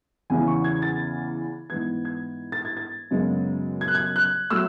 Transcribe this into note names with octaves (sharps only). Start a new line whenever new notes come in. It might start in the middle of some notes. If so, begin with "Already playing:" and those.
E2 C#3 E3 G#5
C#6
G#6
A6
G#2 E3 B3 G#6
G#6
A6
G#6
A6
F#2 C#3 G#3 B3
G#6
F#6
G#6
F#6
F#3 A3 E6